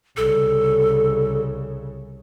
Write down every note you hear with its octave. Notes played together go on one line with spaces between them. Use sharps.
C2 C#3 A4